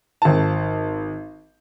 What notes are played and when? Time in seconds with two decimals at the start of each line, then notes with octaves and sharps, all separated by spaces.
0.22 G#1 A5